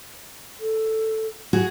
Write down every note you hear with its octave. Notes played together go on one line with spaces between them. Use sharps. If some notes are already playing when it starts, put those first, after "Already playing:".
A4
F#4 G#4